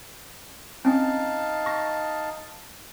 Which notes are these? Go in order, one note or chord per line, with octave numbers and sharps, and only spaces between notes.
C4 C#4 D#4 F5 A5
C#6 A#6